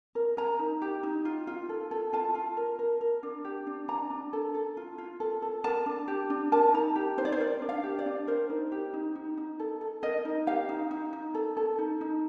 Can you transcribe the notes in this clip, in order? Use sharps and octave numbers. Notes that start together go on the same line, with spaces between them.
A#4
A#4 A#5
D#4
G4
D#4
F4
F4
A4
A4
F4 A5
F4
A#4
A#4
A#4
D4
G4
D4
D4 A#5
D4
A4
A4
F4
F4
A4
A4
A#4 A5
D4
G4
D4
A#4 A5
D#4 A#5
G4
D#4 C5
D5
C5
A#4 D5
D4
F5
G4
D5
D4
A#4 C5
D#4
G4
D#4
D#4
D#4
A4
A4
A#4 D#5
D#4
G4 F5
D#4
D#4
D#4
A4
A4
D#4
D#4